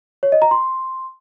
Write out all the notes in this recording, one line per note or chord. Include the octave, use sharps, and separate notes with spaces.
C#5
D#5
A#5
C6